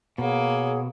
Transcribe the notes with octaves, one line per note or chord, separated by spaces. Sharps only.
B2 A#3 G#4 C#5 F#5